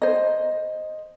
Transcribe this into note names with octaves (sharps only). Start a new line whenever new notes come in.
C5 D#5